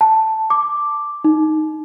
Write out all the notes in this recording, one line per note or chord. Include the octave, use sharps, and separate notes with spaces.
A5
D6
D#4